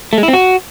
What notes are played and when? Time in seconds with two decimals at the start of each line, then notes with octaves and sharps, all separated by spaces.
0.13 A3
0.18 G#3
0.23 E4
0.28 C4
0.33 F#4